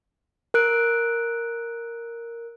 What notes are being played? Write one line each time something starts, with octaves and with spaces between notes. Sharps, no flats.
A#4 F#6 D7